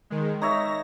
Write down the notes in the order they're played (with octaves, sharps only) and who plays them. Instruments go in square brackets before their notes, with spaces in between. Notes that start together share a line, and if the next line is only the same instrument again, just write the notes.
[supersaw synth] D#3 G#3
[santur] D#4 C#5 E5 [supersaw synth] A#6